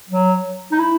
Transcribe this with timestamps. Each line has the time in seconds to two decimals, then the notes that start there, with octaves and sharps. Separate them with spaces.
0.09 F#3
0.72 D#4
0.78 E4